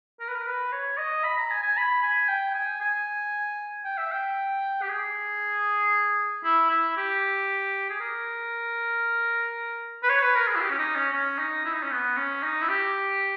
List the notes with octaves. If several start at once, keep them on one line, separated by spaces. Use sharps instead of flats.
A#4
B4
A#4
B4
C#5
D#5
B5
A#5
G#5
G#5
B5
G#5
G5
G#5
G#5
G5
E5
G5
G4
G#4
E4
E4
G4
G#4
A#4
B4
C#5
B4
A#4
G#4
E4
G4
C#4
D#4
C#4
C#4
D#4
E4
D#4
C#4
B3
C#4
D#4
E4
G4